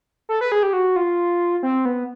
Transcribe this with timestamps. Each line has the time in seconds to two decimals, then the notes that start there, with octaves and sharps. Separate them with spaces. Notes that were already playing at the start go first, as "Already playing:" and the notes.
0.29 A4
0.41 B4
0.52 G#4
0.63 G4
0.73 F#4
0.96 F4
1.63 C4
1.85 B3